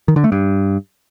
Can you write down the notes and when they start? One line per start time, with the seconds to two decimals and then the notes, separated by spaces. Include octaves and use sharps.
0.08 D#3
0.16 D3
0.24 A3
0.32 G2